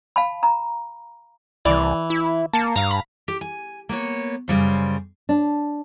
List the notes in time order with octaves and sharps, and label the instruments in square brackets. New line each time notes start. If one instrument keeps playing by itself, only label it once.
[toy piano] F5 A5 B5
A#5
[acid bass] C2 [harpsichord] E3 [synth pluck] D5
[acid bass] E4
[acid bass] A#3 [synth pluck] A5 C#7
[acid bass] G2 [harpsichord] F5 A#5
[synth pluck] B5
[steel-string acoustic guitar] G4
G#5
A#3 B3 C#5
F#2 C#3 G3 C5
[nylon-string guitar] D4